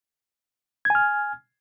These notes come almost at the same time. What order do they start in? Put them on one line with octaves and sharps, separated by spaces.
G#6 G#5 F6